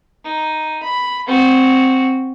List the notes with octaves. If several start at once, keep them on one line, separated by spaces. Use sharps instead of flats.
D#4
B5
C4 F#4